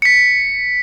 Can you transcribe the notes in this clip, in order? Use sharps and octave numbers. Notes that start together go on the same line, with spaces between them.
B6 C#7